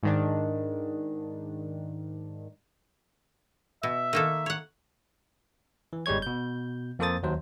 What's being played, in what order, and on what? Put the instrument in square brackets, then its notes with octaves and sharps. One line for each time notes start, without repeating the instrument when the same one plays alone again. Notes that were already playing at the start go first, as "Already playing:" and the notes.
[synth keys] G#2 D#3 D4
[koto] B2 [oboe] E5
[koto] D#3 A#3 A4
C#5 F#5
[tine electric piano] E3
G1 G3 G#3 C#5 G#6
B2 G6
F2 A#3 A4 C5 D#6 A6
D#2 F#3 C5